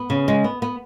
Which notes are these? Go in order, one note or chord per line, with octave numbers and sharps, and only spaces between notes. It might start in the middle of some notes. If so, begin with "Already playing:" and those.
Already playing: B3
C#3
G#3
B3
B3